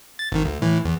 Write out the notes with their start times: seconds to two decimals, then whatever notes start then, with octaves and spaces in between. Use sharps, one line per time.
0.19 A6
0.32 G#1 D#3
0.45 D2
0.62 A2 E3
0.85 E2